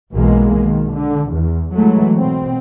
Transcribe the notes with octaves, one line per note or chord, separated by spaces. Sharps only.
B1 B2 E3 G#3 A#3
D#3
D3
E2
E3 F#3 G#3 A3
B2 C4